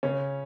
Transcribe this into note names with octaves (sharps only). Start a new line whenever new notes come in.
C#3 C#4